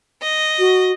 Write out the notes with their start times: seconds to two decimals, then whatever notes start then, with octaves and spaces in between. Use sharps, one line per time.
0.22 D#5
0.59 F#4